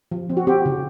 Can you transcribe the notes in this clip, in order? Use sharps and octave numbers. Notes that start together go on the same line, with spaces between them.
F3
C4
F#4
C4 G4
C#3